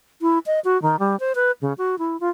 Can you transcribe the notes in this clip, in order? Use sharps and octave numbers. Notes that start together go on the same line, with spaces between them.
E4
D#5
F#4
D#3
G3
C5
B4
C#3
F#4
E4
F4